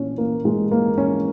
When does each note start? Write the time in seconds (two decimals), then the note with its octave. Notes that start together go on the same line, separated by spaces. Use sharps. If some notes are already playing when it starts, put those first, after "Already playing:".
Already playing: A#2 C#4
0.18 A#3
0.45 G#3
0.71 A#3
0.98 C#4